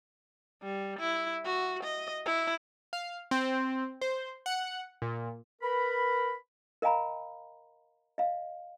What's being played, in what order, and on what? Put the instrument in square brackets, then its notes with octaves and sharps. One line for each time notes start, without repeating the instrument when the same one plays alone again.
[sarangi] G3
E4
F#4
D#5
E4
[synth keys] F5
C4
C5
F#5
A#2
[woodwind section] A#4 B4 B5
[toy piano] A#4 D#5 F5 G#5 A#5 B5
D#5 F5